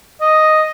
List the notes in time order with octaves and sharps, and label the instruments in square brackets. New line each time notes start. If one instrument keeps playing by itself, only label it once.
[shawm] D#5